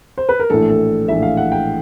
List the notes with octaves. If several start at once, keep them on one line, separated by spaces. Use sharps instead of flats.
C5
B4
A#4
A#1 A2 E3 A4
A4
A#1 A2 E3 E5
F5
F#5
G5